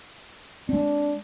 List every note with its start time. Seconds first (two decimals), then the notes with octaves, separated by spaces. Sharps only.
0.69 G#3 C4 D4